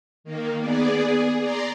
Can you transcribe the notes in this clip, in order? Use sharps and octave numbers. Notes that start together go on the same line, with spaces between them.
D#3 A#3
B3 G#4 D5
G#4
D5 A#5 C6